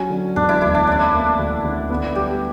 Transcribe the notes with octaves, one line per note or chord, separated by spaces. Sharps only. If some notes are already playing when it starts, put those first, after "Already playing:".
Already playing: F#3 C#4
D3
E1 D4
E4
D2 E4
D4
C#4 D4
A#3
D2
D3
B3
G3 G4